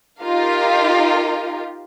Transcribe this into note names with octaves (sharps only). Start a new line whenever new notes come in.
D#4 F4 G4 A#4 F5